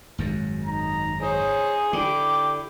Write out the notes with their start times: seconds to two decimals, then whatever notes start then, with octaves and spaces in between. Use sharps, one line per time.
0.18 G#1 F#2
0.64 D#4 A#5
1.20 D#4 G#4 C5 C#5
1.93 D3 E4 G4 G5 D6